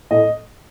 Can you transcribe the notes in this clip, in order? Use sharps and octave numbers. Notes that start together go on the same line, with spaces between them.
A2 D#5